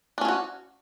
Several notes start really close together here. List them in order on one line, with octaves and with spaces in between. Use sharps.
D4 C#4 G#4 F#4